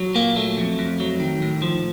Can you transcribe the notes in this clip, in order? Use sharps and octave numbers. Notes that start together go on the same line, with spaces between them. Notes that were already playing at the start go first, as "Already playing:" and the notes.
Already playing: F#3
A#2 A#3
F#3 A3
F2
F2
F#3
D#3
A2
F3